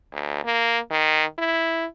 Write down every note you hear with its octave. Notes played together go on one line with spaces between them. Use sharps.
D2
A#3
D#3
E4